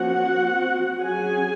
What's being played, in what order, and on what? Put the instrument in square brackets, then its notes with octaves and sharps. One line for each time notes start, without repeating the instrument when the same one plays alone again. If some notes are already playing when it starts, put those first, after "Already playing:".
Already playing: [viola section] F3 A#3 C#4 F#4 F#5
F3 C4
F#3 C#4 G#4 G#5